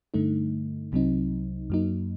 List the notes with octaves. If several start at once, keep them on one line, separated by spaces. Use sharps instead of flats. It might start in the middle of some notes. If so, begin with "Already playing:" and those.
G2 D3 A3 D#4
C2 C3 F#3 C4 D#4
F#2 F#3 A#3 D#4